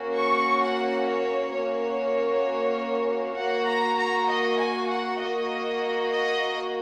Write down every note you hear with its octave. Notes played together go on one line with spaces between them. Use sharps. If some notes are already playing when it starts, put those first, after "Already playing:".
Already playing: A#3 C#4 F#4
C#6
F#5
C#5
A#3 C#4 F#4 C#5
A#3 F#4 F#5
A#5
A#5
D#5
G#5
F#5
A#3 F#4 D#5
D#5